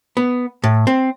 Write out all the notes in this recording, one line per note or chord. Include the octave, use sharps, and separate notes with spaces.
B3
A2
C4